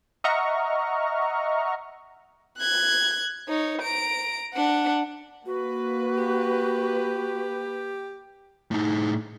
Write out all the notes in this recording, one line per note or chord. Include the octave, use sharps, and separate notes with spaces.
D#5 E5 F#5 A#5 C#6 F6
F#6 G#6
D#4 C#5
A#5 D7
D4 F#5
A#3 F#4 B4
G4
A2 D#4